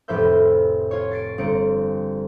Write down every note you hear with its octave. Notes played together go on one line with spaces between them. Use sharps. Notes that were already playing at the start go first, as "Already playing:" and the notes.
F1 A2 B4 C5 E5 G6
F4 C#5
A6 C7 D7
G1 C4 C#7 D7